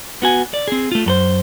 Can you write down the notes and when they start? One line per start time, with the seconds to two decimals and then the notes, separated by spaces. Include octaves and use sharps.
0.22 B3 F#4 G#5
0.54 D5
0.68 C4 G#4
0.92 A3 F4
1.06 F#2 A4 C5